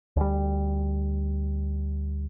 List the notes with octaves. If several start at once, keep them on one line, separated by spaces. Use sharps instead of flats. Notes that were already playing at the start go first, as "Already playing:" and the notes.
D2 G3